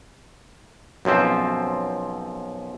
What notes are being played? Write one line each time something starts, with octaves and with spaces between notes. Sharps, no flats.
B1 F#2 F3 C4 C5